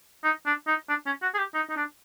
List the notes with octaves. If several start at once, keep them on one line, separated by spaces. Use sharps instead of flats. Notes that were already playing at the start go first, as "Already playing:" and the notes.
D#4
D4
D#4
D4
C#4
F#4
G#4
G4
D#4
D#4
D4